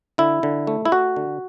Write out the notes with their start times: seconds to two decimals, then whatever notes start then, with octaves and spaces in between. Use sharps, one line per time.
0.18 D3 E4
0.43 D3
0.67 A3
0.85 E4
0.92 A3 F#4
1.16 D3